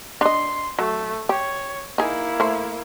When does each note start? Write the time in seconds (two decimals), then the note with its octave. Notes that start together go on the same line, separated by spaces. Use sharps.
0.21 D4 D#5 C6
0.79 F#3 A3
1.29 G4 C#5
1.98 A#3 D#4 E4 G#4
2.40 A3 C5